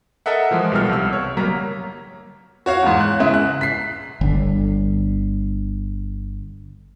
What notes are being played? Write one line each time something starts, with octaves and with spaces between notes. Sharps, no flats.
A4 A#4 D#5 E5 F#5
E3 F3 G#3
B1 G3 B3 A4 F6
C2 E6
C#5
G1 F#3 G3 A#3 A#5 B6
F#4 C#5 F5
E2 G#2
F#6
G#2 C#3 E4
F#6
B6 C7
G1 D3